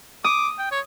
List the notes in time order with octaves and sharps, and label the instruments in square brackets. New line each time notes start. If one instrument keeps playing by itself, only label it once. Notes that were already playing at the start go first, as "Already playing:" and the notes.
[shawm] D6 [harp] D#6
[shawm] G5
C#5